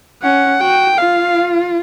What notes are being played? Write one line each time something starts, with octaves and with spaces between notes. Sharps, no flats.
C#4 F#5
F#4 G5
F4 F5